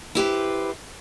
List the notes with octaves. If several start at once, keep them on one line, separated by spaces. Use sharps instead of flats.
E4 G4 B4 C5